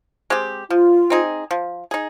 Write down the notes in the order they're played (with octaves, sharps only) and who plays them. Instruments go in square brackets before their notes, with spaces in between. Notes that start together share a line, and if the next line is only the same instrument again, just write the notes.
[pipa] G#3 C4 G4
[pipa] F3 [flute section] F4
[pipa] C4 D#4 G#4
F3
D#4 G#4